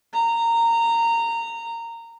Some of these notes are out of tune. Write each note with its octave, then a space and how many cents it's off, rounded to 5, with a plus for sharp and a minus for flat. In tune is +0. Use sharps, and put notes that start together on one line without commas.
A#5 -15